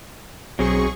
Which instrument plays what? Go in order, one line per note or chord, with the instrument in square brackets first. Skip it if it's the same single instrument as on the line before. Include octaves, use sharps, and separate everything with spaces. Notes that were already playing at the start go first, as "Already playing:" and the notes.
[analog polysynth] B1 G#4 C#6 [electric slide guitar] F#3 C4